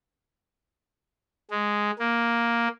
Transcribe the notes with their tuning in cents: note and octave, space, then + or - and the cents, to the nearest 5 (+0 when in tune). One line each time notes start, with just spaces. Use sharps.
G#3 +0
A#3 +5